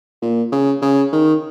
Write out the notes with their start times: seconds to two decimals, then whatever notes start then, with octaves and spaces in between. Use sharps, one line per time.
0.22 A#2
0.52 C#3
0.82 C#3
1.12 D#3